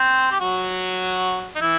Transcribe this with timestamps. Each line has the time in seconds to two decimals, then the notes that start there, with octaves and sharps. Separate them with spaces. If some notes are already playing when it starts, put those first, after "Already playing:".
Already playing: C4 C5
0.31 G4
0.40 F#3 F#4
1.56 D#4
1.61 E3 E4